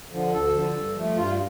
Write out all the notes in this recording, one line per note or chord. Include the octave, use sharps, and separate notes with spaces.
D3 F3
D2 A4
D3 F3
G2
F3 A3
G2 F4